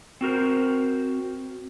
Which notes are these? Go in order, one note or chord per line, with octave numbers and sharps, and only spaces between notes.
C4 F#4 A#4 C5